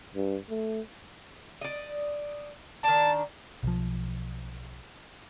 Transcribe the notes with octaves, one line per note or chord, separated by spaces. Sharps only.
G2
A3
D5 D#5
D#3 D4 A5
B1 F3